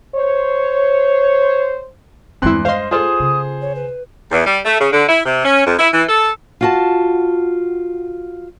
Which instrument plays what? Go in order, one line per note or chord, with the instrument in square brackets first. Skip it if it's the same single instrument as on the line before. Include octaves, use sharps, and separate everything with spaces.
[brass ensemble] C5 C#5
[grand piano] E2 C6 F#6 [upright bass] G2 G#3 [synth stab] C4 E4
[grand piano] C5 D#5 [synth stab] F5 C6
[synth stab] F4 A4 [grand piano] G#4 C5 [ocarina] D#6
[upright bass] C#3
[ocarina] C#5
B4
[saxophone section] E2
G3
A3
C#3
D3
E4
C3
C#4
F2
E4
E3
A4
[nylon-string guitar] F4 F#4 A5